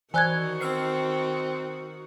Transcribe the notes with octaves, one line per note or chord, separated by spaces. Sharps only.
D#3 E3 F#4 C5 D5 G#5 F#6 G#6
C4 E6 F6 C7